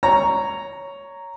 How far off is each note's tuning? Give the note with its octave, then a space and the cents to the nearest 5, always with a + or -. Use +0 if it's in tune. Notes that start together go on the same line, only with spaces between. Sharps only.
C#5 +5 A#5 -5